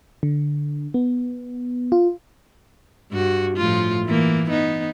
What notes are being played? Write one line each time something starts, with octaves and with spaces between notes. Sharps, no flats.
D3
B3
F4
G2 F#4
A2 F3 F4
E3 A#3
B3 D#4